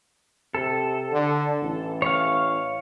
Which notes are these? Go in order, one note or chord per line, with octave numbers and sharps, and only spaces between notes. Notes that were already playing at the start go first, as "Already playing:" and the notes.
C3 A4
D3
A1
C#5 F5